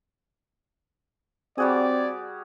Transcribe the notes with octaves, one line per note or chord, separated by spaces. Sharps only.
G3 C4 F#4 G#4 D5